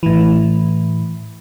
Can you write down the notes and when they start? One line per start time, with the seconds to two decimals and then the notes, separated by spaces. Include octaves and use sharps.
0.03 A2 E3